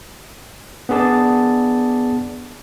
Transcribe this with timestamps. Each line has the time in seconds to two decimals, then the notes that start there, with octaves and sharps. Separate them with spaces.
0.89 B3 D4 G#4 D5 A5